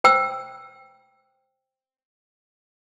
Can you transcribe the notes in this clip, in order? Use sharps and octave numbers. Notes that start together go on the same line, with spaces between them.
C5 G5 E6